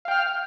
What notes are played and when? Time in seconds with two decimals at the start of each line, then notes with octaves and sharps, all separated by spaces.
0.05 F5
0.08 G5
0.11 F6